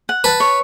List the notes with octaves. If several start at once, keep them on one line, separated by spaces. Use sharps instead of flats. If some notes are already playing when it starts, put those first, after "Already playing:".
F#5
B4 A5
C#5